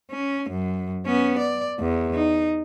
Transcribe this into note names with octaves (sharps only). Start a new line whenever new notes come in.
C#4
F#2
B3 C#4
D5
E2
D#4